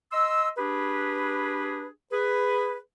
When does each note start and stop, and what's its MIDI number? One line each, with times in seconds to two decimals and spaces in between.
0.11 0.49 75
0.11 0.49 84
0.11 0.49 88
0.57 1.87 62
0.57 1.87 67
0.57 1.87 68
0.57 1.87 71
2.12 2.78 68
2.12 2.78 71